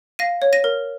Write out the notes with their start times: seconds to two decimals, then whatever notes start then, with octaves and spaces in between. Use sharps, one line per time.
0.19 F5 A#6 D#7
0.42 C#5
0.53 A#6 D#7
0.64 A#4